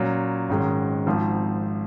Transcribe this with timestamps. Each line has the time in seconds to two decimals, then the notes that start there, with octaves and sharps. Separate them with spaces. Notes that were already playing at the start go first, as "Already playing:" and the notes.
Already playing: A#2 F#3 C#4
0.49 G#1 G#2 D#3 G#3 C#4
1.06 G#1 G#2 F3 C4